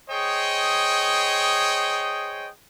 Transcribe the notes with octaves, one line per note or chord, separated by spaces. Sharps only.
G#4 C5 C#5 D#5 G5